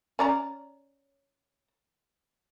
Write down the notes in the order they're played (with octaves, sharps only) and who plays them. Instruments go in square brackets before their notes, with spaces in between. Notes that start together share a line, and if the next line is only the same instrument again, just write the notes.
[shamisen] C#4 D5 A#5